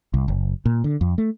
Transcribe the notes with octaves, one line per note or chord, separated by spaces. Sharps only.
C2
F#1
A#2
D3
F2
A3